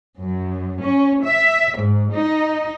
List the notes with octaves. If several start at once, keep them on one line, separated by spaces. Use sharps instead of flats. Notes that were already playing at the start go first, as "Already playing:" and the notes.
F#2
C#4
E5
G#2
D#4